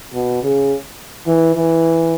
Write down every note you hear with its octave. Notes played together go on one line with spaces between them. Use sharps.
B2
C#3
E3
E3